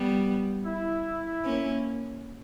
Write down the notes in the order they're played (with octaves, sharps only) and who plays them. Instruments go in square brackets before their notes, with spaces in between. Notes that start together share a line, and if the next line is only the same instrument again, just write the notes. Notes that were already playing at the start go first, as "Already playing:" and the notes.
Already playing: [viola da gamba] G3 B3
[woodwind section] E4
[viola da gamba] A#3 C#4